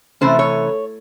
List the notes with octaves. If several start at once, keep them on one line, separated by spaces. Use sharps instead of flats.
C3 E3 A3 C#4 C5
C#5